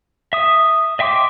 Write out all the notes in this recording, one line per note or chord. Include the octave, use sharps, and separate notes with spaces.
E5 D#6
D#5 E5 G5 C6 D6